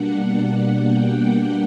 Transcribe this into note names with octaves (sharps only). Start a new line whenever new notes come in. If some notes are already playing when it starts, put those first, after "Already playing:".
Already playing: B2 G3 A#3 D4 F#5
G5